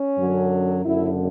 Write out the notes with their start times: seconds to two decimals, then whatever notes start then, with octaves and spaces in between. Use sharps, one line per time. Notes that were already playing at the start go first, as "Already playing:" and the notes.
Already playing: C#4
0.17 F#2 D3 F#3
0.83 F#1 F#2 D3 E4